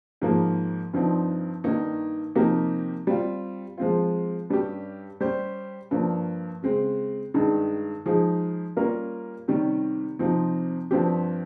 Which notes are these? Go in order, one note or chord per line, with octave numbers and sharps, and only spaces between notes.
G#2 F3 A#3
G2 F3 C4 D#4
G2 D#3 A#3 D#4
C3 F3 A#3 D#4 G4
G3 C4 F4
F3 G#3 C4 F4
G2 G3 C#4 G4
G3 C#4 G4 C5
G2 F3 A#3
C#3 G#3 C4
G2 D#3 G#3 D#4
F3 G#3 D#4 G#4
G3 A#3 C#4 F4 A#4
C3 D#3 G3 C#4
C3 F3 C4 D#4
G2 F3 C4 G4